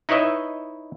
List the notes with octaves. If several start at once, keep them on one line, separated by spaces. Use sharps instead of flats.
D#4 E4 B4 C#5 D#5 E5